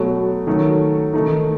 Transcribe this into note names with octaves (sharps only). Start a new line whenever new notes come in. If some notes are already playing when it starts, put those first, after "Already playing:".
Already playing: B2 F#3 A3
D#3 F#3 A3 C#4
D#3 A3 D#4